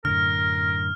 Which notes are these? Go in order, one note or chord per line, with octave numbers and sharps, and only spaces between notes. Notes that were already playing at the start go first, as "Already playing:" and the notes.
F#2 A2 D3 A#4 F6